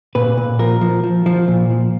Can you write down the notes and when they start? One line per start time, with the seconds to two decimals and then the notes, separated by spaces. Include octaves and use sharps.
0.15 A#2 B4
0.37 A#2
0.59 F3 A#4
0.81 F3
1.04 F3
1.26 F3
1.48 A#2
1.70 F3